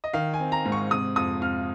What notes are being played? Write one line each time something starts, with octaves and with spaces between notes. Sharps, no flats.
D#5
D#3 F5
G#5
C4
A#5
G#2
C#6
C3 D#6
F2 D#6
F2 F6